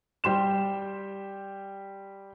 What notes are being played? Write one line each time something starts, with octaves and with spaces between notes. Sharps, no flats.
G3 G4 C6 E7